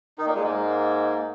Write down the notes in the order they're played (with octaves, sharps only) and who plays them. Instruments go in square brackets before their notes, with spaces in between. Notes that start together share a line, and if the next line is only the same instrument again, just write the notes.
[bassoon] D#3 [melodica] D#4
[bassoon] A#2 [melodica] A#3
[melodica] G#3
[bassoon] G#2 [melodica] A#3